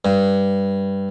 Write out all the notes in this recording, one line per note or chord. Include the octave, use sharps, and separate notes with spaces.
G2